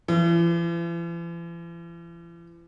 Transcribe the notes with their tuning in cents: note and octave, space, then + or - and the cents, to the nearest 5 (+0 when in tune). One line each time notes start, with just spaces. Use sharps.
E3 +45